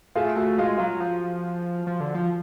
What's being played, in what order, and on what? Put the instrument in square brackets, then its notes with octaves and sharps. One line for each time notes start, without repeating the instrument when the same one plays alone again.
[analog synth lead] A3 [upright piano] F4 G#4
[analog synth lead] A3 [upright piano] F#4
[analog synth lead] G#3 [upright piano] F4
[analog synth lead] F#3 [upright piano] F4
[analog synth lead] F3
F3
D3
F3